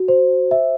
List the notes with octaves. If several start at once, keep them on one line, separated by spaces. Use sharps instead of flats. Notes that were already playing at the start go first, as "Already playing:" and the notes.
Already playing: F#4
C5
E5